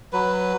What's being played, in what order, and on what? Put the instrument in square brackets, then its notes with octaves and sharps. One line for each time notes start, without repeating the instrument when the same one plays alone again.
[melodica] F#3 B4